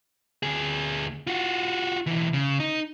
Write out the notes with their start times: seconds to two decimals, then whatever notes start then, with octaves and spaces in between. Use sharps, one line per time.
0.43 D2 G#4
1.27 F4 F#4
2.06 B1 E3
2.33 C#3
2.60 D#4